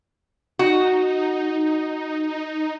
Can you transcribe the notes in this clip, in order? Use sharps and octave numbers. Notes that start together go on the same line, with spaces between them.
D#4 F#4